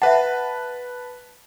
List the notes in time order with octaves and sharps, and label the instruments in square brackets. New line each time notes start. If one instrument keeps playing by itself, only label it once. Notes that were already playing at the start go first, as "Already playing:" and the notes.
[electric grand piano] B4 A5 [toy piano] E5 F#5